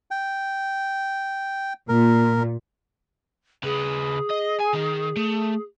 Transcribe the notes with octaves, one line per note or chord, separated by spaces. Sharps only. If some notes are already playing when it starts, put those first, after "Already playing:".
G5
A#2 A#4
C#3 G#4 B4
D#5
G#5
D#3 D#4
A3